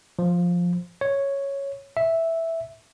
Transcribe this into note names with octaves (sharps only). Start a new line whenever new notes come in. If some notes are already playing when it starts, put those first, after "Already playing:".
F3
C#5
E5